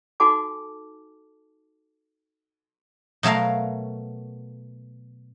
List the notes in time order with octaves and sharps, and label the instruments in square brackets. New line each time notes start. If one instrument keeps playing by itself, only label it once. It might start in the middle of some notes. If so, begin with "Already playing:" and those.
[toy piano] D#4 F#4 A4 G#5 A5 D6
[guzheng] B2 F#3 A3 A#4 F5